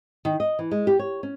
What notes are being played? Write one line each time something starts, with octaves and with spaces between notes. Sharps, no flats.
D#3
D#5
E3
G#3
G4
C#5
C#4